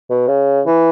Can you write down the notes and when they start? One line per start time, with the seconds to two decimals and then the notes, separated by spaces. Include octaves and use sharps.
0.10 B2
0.27 C#3
0.66 E3